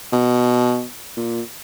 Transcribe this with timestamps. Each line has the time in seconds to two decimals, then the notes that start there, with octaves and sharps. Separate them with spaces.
0.12 B2
1.17 A#2